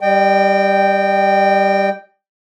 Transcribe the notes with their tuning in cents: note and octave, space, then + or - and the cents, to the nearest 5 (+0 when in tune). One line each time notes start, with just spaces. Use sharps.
G3 +0 D#5 -35 G5 +0